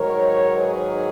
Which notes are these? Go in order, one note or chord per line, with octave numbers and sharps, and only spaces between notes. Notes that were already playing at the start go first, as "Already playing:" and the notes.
Already playing: G#2 D#3 F#3 A#4 C#5
G#4 B4